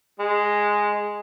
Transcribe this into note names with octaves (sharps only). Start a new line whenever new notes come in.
G#3